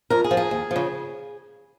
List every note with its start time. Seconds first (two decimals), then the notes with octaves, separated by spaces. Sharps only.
0.10 F2 A#4
0.24 G#4
0.31 F3
0.37 G#4
0.51 D#2
0.71 F3
0.76 C#3